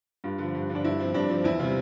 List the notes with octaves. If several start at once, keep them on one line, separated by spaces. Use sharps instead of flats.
G2 F4
D3 F3
G2
D3 F3
D4
G2 E4
F3 C4
G2 D4
F3 C4
E2 E4
C3 G3 F4